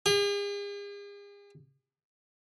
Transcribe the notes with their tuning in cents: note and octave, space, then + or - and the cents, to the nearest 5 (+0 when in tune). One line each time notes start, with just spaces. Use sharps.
G#4 -45